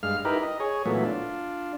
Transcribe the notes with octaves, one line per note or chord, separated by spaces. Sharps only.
G2 G#3 F5 F6
D#4 E4 G4 A#4 B4
D#5
G#4 C#5
A#2 E3 F#3 A3 B3
D4 F4